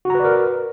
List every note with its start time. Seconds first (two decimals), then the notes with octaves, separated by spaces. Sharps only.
0.05 F#4
0.10 A#5
0.15 B4
0.20 D5
0.24 A#4